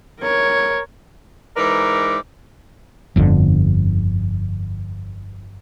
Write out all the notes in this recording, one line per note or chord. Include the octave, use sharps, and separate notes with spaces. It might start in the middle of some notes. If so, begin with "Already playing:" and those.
A#4 C#5
G#2 E3 A#4 B4 D5
G1 F2 D3